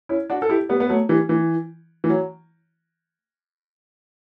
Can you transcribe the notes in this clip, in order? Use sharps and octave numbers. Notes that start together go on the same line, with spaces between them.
C#4 E4
D4 F#4
A4
E4 G4
G3 B3
B3
F#3 A3
E3 G3
E3
E3
F#3